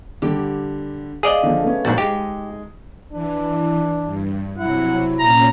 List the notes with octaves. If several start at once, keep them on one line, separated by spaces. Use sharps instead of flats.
D3 G3 G4
G#4 D5 D#5 F5
D3 F3
A3 B3 C#4
A#1 G#2 D4 F#4 A6
G#3 D#4 G4
E3 D4
G2
C3 F#3 E4 F#5
A#2 C#4 A#5